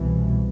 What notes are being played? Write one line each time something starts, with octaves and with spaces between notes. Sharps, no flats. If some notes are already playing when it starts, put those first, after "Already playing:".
Already playing: C2 B2 E3